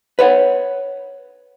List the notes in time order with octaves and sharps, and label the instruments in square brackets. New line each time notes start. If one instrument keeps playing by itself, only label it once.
[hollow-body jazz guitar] B4 C#5 F#5